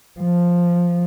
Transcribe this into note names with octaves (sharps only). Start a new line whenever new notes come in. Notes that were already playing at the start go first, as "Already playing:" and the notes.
F3